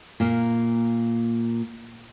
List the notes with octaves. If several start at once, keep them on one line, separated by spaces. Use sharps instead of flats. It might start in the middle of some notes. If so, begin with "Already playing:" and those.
A#2 A#3